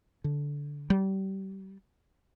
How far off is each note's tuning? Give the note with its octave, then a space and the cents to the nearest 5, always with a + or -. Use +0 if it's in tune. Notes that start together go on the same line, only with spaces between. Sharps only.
D3 -15
G3 -30